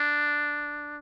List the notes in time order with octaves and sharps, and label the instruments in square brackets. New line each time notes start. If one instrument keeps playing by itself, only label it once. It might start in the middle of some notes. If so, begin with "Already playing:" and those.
Already playing: [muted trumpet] D4